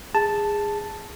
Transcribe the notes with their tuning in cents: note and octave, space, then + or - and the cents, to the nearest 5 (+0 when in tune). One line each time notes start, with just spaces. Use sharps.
G#4 -15 A5 +0